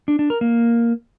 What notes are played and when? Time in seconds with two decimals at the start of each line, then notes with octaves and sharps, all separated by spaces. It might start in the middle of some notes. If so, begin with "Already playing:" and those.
0.08 D4
0.19 D4
0.30 A#4
0.41 A#3